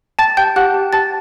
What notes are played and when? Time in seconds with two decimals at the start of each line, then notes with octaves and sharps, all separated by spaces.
0.19 G5 A5 A6
0.37 G4 G5 G6
0.56 G4 F#5 F#6
0.74 G4
0.93 G4 A5 A6